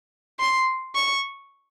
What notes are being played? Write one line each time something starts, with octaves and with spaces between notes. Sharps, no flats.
C6
C#6